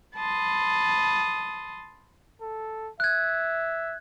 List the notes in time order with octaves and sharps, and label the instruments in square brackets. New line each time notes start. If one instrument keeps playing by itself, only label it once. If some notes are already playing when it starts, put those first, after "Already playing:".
[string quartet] A5 B5 C6 D#6
[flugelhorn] A4
[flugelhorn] E5 [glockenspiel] F#6 G#6